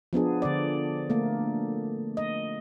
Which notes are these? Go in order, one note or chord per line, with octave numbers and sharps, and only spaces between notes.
F3 B3 D4 G#4
D3 D5
A3 A#3
D#5